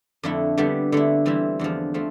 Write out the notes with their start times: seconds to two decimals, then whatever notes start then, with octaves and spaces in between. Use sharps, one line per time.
0.23 F2 D3 A3 E4
0.58 D3 G3 B3 D4 G4
0.92 D3 A3 E4
1.26 E3 G3 C4 E4
1.59 E2 D3 F3
1.94 F3 A3 C4